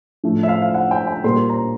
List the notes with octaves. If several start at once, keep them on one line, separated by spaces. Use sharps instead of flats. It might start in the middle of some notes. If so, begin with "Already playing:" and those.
A2 F3 A3
E5
F5
F5
F#5
G5
G5
A#2 G3 A#3 C6
A#5